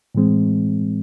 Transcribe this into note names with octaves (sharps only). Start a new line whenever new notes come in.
A2 E3 G#3 C4